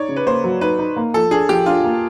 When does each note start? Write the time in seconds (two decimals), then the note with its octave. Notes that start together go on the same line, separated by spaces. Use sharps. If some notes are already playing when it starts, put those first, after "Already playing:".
Already playing: D#4 C#5 D5
0.09 C#3
0.16 B4
0.27 A#3 C5
0.44 F#3
0.61 D#4 B4
0.79 D#4
0.96 A#3
1.14 F3 A4
1.31 D4 G#4
1.49 F3 G4
1.66 D4 F4
1.84 A#3